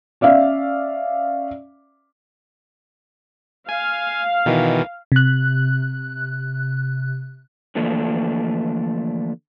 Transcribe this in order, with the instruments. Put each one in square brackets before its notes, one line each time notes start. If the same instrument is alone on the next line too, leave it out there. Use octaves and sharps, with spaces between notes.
[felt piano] C#4 D5 E5 F5
[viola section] F5 [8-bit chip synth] G#5
[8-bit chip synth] B2 D#3 E3
[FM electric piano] C3 F#6
[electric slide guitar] D3 E3 F3 A3 A#3 D4